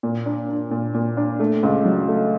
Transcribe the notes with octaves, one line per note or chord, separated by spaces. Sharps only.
A#2
D4
D4
A#2
A#2
D4
A3
C#2
F#3
A3